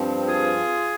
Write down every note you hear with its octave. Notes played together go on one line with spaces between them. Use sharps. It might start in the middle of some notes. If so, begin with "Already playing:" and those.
Already playing: G2 F3 C4
F4 G#4